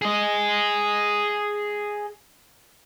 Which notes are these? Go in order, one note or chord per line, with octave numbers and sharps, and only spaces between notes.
G#4 D#5